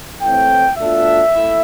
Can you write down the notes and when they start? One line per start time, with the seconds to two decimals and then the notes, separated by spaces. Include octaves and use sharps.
0.21 A2 E3 A3 C4 G5
0.77 B2 A3 D4 F4 E5
1.33 A3 E4